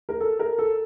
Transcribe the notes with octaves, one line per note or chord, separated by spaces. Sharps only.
A#4
A4
A#4
A4